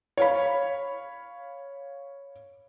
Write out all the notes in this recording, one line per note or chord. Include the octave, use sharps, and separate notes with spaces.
C#5 F5 B5